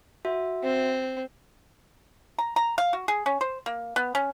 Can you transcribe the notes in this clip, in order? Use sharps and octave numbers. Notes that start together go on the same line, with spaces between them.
F#4 E5
C4
A#5
A#5
F5
F#4
G#4
C#4
C5
A#3
B3
C#4